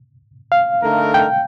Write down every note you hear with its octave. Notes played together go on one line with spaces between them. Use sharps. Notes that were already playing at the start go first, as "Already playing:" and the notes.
F5
D3 A3 D#4 A#4
G5